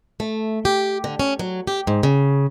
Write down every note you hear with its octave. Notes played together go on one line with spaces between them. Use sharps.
A3
G4
D3
C#4
F#3
G4
G#2
C#3